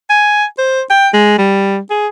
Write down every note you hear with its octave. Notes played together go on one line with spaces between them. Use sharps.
G#5
C5
G5
G#3
G3
G#4